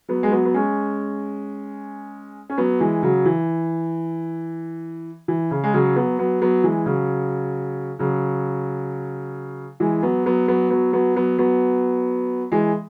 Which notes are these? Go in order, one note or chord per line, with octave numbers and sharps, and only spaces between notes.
F#3 B3
G#3
F#3 B3
B3
G#3 C#4
C#4
F#3 B3
E3 G#3
C#3 F#3
E3
E3
C#3
G#3
C#3 F#3
F#3 B3
F#3 B3
F#3 B3
E3 G#3
C#3 F#3
C#3 F#3
E3 G#3
F#3 B3
F#3 B3
F#3 B3
F#3 B3
F#3 B3
F#3 B3
F#3 B3
E3 G#3